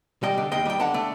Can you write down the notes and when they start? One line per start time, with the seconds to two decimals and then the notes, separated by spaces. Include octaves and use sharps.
0.23 G3 D#5 G5
0.38 D3
0.52 D#2 D#5 G5
0.66 G3 G5
0.80 D3 F#5 A5
0.94 A3